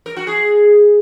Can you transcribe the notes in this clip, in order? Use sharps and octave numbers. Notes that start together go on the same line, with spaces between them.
A#4
F#4
G#4